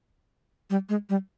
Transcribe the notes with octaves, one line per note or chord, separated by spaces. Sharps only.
G3
G#3
G3